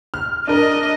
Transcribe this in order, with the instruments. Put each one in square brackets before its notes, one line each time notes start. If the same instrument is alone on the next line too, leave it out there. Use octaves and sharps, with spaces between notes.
[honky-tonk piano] F6
[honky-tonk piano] D4 A#4 [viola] D#5